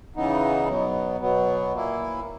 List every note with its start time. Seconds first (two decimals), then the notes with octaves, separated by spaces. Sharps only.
0.16 C#3 E3 B3 D#4
0.68 B2 F#3 B3
1.21 B2 F#3 B3
1.73 A#2 A#3 E4